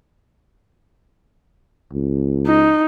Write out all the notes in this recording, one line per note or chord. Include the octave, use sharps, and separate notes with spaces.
C#2
D#4